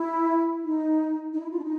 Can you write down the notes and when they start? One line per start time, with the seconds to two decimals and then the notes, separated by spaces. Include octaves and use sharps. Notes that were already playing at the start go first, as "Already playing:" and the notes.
Already playing: E4
0.64 D#4
1.33 D#4
1.39 E4
1.51 F4
1.58 D4
1.64 D#4